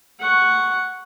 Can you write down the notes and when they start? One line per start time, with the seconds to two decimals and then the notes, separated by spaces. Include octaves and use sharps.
0.20 F#5 C#6